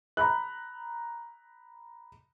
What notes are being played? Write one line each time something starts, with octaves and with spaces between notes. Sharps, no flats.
A#5 B5 F#6